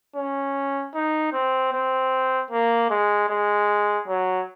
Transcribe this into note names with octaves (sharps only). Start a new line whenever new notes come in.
C#4
D#4
C4
C4
A#3
G#3
G#3
F#3